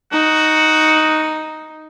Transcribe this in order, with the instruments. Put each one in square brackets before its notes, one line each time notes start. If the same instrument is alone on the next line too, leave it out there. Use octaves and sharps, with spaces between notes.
[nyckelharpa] D#4 [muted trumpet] F#4